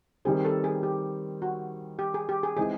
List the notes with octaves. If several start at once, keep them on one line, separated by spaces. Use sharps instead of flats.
D#3 G3 C4 G#4
A4
G#4
G4
F#4
G4
G#4
G4
G#4
E3 G#3 C4 D#4 G#4